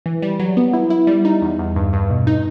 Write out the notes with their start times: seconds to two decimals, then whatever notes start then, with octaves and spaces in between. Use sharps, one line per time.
0.06 E3
0.22 G3
0.40 F#3
0.57 B3
0.73 E4
0.90 E4
1.07 G3
1.25 D#4
1.41 E2
1.59 E2
1.76 G2
1.93 G2
2.10 B2
2.27 D#4